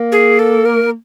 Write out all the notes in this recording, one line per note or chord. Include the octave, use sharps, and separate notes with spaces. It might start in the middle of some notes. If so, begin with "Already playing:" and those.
Already playing: A#3
G#4
A4
A#4